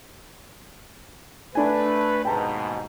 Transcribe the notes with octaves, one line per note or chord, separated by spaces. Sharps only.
A3 D4 B4 G#5
D#2 G#2 B2 G5 A5 A#5